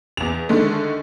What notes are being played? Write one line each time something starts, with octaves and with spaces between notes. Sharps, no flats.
E2 F7
D3 D#3 G#3 A3